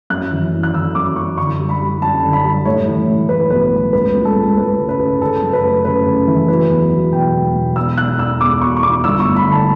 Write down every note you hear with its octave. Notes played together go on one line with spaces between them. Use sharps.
F#2 F#6
E3
F#2
F#6
E3 E6
F#2 D6
F#2 C#6
D3 C#6
G3
B5
G3
F#2 A5
D3
B5
G3
A2 C#5
E3
A3
A3 B4
B1 B4
A2
C#2 B4
C#2
A4
C#2
C#2 B4
C#3
B4
C#3
C#3 A4
F#2
B4
A3
C#3 B4
C#3
E3
F#3 B4
E2
F#3
E1 G5
E2
E1
E2 E6
B2 F#6
E2 E6
E2 D6
B2 C#6
C#6
B2 D6
G1 E6
C#6
A3
B5
D3
A5